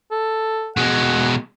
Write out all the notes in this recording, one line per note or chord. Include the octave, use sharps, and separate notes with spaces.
A4
B2 G#3 F#5